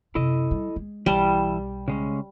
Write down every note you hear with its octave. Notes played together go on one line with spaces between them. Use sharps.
F#2 C3 E4 A4 D#5
G3
G#3
B1 E3 G3 E4 A5
C#3 G#3 C#4